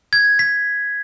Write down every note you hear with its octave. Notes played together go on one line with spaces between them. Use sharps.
G#6
B6